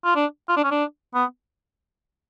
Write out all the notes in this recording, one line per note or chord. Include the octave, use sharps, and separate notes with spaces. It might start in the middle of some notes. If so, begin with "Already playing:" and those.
F4
D4
F4
D4
C#4
D4
B3